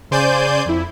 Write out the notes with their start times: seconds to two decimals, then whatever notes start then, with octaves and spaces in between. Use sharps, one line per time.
0.11 C#3 C5 D5 G#5 G6 D#7
0.66 F2 E4